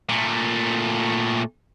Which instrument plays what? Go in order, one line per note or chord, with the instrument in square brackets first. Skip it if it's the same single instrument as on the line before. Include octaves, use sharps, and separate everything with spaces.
[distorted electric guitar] A#2 A3